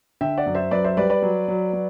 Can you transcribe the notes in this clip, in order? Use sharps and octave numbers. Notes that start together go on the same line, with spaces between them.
D3 E5 G5
D5 F#5
F#2
C5 E5
F#2 B4 D5
C5 E5
G3 B4 D5
B4 D5
F#3
F#3
F#3